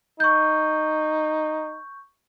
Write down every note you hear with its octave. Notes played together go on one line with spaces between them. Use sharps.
D#4 C#6 G6